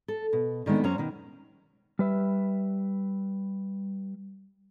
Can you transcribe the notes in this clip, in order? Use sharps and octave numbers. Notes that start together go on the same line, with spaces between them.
A4
B2
D3 D#3 G#3 B3 C4
F#2 C#4 C5 A#5
B2 D#3
G3 B4 E5